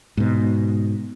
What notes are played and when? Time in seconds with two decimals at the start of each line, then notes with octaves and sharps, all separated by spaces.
0.17 G#2 B2